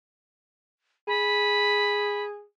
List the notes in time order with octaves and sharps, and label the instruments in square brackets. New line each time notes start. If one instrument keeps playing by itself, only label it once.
[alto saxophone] G#4 [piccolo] B5